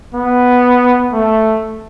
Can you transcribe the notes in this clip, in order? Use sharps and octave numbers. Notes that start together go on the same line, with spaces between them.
B3
A3